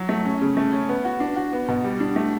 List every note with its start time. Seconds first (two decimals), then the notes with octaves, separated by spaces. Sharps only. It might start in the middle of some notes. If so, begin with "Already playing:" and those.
Already playing: F#3
0.09 A3
0.25 C#4
0.42 C#3
0.57 A3
0.73 C#4
0.89 B3
1.05 F#4
1.20 D4
1.36 F#4
1.53 B3
1.68 B2
1.84 G3
2.00 D4
2.16 A3